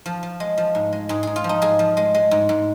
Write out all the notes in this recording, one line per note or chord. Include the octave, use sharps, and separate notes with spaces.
F3
F3
G#3
F3
G#2
G#3
G#2 G#4
G#2 G#4
F4
F3
D#4
G#2 G#4
F3
G#3
G#3
G#2
G#2